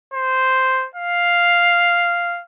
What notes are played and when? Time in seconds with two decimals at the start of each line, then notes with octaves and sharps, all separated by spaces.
0.14 C5
0.95 F5